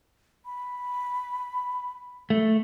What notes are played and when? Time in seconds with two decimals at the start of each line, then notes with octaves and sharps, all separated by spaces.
0.45 B5
2.30 A3